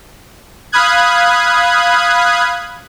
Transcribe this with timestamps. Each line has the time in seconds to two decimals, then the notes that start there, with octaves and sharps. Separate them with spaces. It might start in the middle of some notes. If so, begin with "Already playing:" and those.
0.72 F5 B5 D#6 F#6 G#6